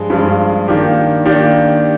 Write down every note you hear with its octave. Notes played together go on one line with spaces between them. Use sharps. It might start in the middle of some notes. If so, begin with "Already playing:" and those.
Already playing: G2 F3 G#3
G2 F3 G#3
D#3 A#3 D4 G4
D#3 A#3 D4 G4